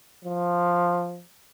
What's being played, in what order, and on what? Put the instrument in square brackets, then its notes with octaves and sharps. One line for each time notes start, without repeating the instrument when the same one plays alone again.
[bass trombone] F3